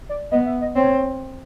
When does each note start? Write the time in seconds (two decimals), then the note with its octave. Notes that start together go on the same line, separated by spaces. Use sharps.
0.09 D5
0.31 B3 D#5
0.46 E5
0.61 D#5
0.75 C4 C#5